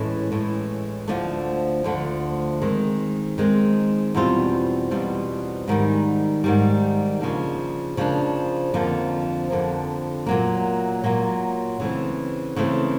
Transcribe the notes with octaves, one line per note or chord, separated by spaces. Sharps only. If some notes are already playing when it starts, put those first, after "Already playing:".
Already playing: A2 E3 G#3 C#4
A2 E3 G#3 C#4
D2 D3 F3 A3
D2 D3 F3 A3
D#3 G#3 C4
D#3 G#3 C4
E2 B2 G3 C4 F4
E2 B2 G3 C4 F4
G#2 D#3 G3
G#2 D#3 G3
C#3 F3 A#3 D4
C#3 F3 A#3 D4
F2 D3 F3 A#3
F2 D3 F3 A#3
A#2 F#3 A#3
A#2 F#3 A#3
C#3 E3 A3 C4
C#3 E3 A3 C4